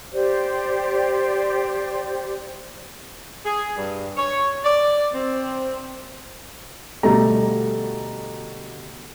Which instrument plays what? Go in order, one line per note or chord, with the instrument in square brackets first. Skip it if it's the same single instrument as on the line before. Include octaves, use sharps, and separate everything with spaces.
[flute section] G4 C5 D5
[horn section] G#4
G2
C#5
D5
C4
[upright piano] D2 B2 G3 A3 A#5